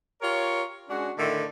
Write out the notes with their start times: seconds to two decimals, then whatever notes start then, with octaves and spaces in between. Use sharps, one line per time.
0.21 F4 G4 A#4 C#5
0.89 G#3 C#4 D4 F#4
1.18 A2 D3 D#3 A3